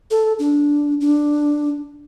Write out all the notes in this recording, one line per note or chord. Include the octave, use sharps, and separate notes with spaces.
A4
D4
D4